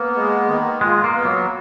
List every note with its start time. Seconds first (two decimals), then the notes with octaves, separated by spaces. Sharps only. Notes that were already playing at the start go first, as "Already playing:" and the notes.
Already playing: A#3 B3
0.15 G#3
0.48 D#3
0.81 G#3 F4
1.04 A#3
1.15 B3
1.25 F#3